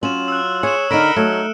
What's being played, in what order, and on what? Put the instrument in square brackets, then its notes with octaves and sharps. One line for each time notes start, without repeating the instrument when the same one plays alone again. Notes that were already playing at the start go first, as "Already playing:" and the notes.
[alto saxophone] F#3 [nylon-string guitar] C#4 [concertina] F4 [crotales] E7 F#7
[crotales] E6 F#6
[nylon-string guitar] G#4 [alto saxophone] C#5 [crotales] C#7 E7
[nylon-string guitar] D3 D#4 [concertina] A#4 A#5 B5 [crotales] F6 D7 E7
[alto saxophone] F#3 [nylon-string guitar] A3 [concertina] D#4